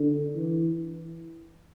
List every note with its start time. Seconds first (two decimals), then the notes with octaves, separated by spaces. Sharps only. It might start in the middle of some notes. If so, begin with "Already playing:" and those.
Already playing: D3
0.36 E3